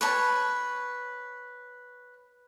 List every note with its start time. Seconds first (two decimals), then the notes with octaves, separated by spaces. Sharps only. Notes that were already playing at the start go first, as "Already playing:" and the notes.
0.01 B4 C#5 A5